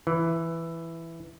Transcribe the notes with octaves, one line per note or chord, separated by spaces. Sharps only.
E3